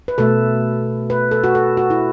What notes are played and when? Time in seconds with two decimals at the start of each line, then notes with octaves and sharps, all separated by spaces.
0.08 B4
0.18 B2 A3 A4
1.10 B4
1.31 A4
1.44 F#4
1.55 A4
1.77 F#4
1.90 E4